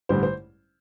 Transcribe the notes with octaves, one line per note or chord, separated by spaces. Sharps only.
A1 G2 D3 G3 C5
C5